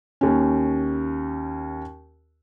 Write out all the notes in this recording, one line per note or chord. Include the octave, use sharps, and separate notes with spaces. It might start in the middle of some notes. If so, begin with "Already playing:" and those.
D#2 C#4